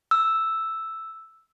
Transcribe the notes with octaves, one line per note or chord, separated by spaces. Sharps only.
E6